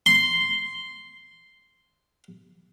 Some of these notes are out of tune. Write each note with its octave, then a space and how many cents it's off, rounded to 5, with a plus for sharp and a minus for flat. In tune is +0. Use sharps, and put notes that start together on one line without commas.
C6 -5